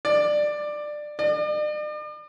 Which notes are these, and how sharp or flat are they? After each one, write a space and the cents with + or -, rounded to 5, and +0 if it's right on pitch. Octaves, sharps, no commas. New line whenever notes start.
D5 +15
D5 +45